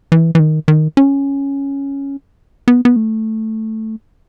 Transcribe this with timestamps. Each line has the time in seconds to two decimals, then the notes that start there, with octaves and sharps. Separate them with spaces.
0.12 E3
0.35 E3
0.40 D#3
0.68 D#3
0.97 C#4
2.68 B3
2.85 B3
2.96 A3